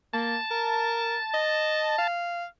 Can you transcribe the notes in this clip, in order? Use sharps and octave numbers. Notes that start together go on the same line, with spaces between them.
A#3 A5
A#4
D#5
F5